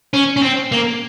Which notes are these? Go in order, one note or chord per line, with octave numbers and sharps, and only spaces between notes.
C#4
C#4
C4
A#3